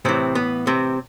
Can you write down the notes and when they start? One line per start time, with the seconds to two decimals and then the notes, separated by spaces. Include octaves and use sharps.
0.05 A2 C3 E3 C4
0.35 B3
0.67 C3 C4